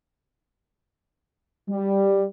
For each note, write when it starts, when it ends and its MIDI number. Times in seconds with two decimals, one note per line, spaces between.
1.69 2.24 55